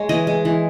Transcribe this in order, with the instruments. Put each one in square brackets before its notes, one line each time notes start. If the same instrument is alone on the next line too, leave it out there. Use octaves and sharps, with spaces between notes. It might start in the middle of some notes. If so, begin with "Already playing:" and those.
Already playing: [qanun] G#3 C#5
E3 D#5
G#3
E3